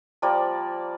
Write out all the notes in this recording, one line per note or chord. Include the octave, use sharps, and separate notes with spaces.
F3 G3 A#3 D5